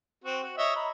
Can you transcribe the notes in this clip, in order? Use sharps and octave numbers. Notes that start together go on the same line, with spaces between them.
C4 F#4
F#4
C#5 D#5 E5
A#5 B5